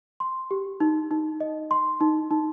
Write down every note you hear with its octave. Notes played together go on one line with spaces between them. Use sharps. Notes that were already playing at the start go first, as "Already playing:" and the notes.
C6
G4
D#4
D#4
D#5
C6
D#4
D#4